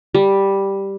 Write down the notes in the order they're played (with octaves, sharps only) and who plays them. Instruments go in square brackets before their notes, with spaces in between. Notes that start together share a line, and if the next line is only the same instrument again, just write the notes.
[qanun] G3